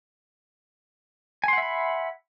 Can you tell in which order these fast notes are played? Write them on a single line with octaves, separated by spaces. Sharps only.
G#5 C6 F#5 E5 B5